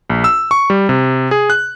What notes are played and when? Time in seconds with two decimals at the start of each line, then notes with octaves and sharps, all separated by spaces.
0.10 A#1
0.24 E6
0.51 C#6
0.70 G3
0.89 C3
1.31 G#4
1.50 F#6